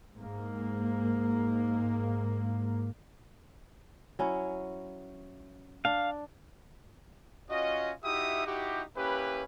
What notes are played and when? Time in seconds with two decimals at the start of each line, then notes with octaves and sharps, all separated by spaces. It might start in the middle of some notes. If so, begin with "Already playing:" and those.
0.17 G#2 A#3
4.19 F#3 C#4 E4
5.85 D4 F5
7.50 C#4 F4 F#4 D#5
8.04 D#4 E4 F#4 G4 E5 D#6
8.46 D#4 E4 F#4 G4
8.97 A#3 C#4 E4 G4 B4